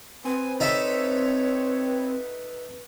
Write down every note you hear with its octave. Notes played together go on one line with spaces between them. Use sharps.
C4 B4 G#5
D#4 A4 C#5 E5